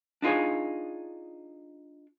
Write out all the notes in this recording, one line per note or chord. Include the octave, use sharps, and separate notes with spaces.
D4 D#4 F4 G#4 C#5